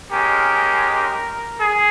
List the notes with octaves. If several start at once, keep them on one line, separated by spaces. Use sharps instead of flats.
G#3 C#4 G4 A#4
G#4